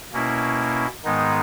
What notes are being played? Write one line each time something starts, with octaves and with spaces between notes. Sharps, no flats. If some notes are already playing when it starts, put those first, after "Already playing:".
B2 A#3 C#4 E4
G#2 D#3 G#3 B3 D#4